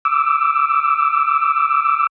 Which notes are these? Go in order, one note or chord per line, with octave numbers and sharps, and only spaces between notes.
D6 E6